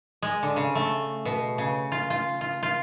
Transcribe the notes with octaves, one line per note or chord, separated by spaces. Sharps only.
G#3
D3
C#3
A3
B2
C#3
F4
F4
F4
F4